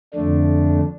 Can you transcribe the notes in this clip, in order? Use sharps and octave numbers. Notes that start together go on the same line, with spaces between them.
F2 D3 A3 D4